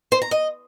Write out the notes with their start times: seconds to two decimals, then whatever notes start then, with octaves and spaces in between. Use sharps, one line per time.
0.12 C5
0.22 A#5
0.31 D#5